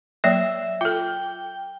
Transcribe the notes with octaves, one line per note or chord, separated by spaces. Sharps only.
F#3 A#3 C#5 E5
F4 A4 G5